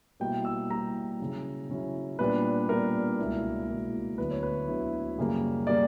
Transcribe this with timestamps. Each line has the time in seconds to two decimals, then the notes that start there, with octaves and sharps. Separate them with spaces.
0.20 B2 G3 A#3 E4 G5
0.45 E6
0.70 B2 G3 A#3 E4 A#5
1.19 C#3 F#3 C#4 E4
1.69 C#3 F#3 C#4 E4
2.19 A#2 G3 B3 D4 B4
2.69 A#2 G3 B3 D4 A#4
3.18 C#2 B2 A#3 E4
3.68 C#2 B2 A#3 E4
4.18 D2 D3 F#3 B3 E4 B4
4.31 C#5
4.43 B4
4.68 D2 D3 F#3 B3 E4
5.18 F#2 C#3 G3 A#3
5.67 C#3 G3 A#3 D5